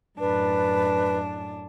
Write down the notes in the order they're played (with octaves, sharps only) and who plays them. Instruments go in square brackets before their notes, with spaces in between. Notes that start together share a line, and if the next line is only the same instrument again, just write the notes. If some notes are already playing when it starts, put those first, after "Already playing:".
[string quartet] F#2 A2 D4 [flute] B4